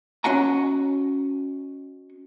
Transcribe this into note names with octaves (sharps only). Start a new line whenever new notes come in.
C#4 F#4 D#5 F#5 G#5 A#5